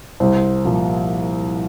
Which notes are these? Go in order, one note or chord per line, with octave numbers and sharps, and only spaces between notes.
C2 C5
A#2 F3